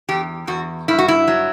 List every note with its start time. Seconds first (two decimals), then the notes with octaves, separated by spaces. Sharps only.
0.08 E2 G4
0.47 E2 F#4
0.88 G2 E4
0.98 F#4
1.08 E4
1.28 F#3